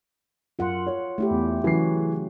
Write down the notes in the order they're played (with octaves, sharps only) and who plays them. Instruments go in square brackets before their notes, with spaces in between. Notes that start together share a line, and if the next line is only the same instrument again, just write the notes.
[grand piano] F#2 C6 [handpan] F4 F#5
[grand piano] C#5
[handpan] A3 E4 G4
[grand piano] E2
[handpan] C#3 F#3 F#4 [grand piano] E3 C7